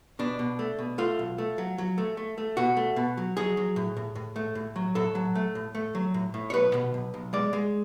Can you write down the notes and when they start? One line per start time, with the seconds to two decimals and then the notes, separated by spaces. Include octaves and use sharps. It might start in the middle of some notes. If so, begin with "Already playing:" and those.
0.19 B2 D4
0.39 B2
0.59 A3
0.79 B2
0.98 A3 F4
1.19 B1
1.38 A3
1.58 F#3
1.78 F#3
1.98 A3
2.17 A3
2.38 A3
2.57 B2 F#4
2.77 A3
2.96 B2
3.17 F#3
3.37 F#3 G#4
3.57 F#3
3.76 A2
3.97 A2
4.15 A2
4.36 A3
4.55 A2
4.76 F#3
4.95 A2 A4
5.15 F#3
5.35 A3
5.55 A2
5.75 A3
5.95 F#3
6.14 A2
6.34 A2
6.50 C#5
6.54 B1 B4
6.74 B2
6.94 B1
7.14 B1
7.33 G#3 D5
7.53 G#3